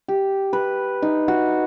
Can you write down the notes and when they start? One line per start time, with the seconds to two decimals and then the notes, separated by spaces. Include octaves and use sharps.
0.08 G4
0.53 B4
1.02 D#4
1.28 F#4